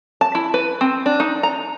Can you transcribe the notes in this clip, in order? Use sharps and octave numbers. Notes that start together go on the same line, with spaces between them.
A5
E4
B4
C4
D4
D#4
A#5